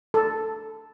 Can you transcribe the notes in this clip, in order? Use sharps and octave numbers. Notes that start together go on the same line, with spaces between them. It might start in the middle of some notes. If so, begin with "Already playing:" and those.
A4